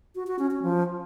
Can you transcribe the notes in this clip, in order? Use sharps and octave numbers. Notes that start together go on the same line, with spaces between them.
F#4
F#4
C#4
C#4
F3